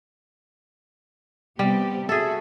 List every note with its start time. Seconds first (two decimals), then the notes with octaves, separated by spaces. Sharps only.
1.59 C3 G3 B3 G4
2.09 F#4 G#4 A4 E5